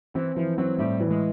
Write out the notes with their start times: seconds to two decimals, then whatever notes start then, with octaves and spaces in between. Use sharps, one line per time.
0.15 E3 C4
0.37 E3 F3
0.58 F#3 C4
0.78 A2 G3
1.00 E3
1.11 G#3